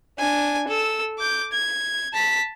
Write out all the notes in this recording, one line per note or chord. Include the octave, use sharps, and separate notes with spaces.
D4 G#5
A4 E6
D6 G6
G#6
A5 B6